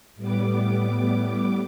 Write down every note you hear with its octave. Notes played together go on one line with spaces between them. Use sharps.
A2 G3 B3 D6